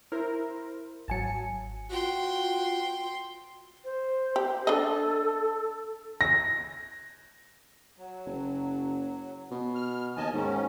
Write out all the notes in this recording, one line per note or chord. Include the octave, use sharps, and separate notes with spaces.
E4 A#4 C5
G#1 F#3 G#5 A5 C#7
F4 F#4 G5 C6
C5
G4
D4 A4 D#5
A#6
F#3
F#1
B2
F6
D#2 D#5 G#5 A5
G#2 D#3 C#4